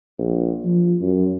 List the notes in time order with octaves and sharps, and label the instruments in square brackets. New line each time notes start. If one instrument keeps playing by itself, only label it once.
[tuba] A#1
F3
F#2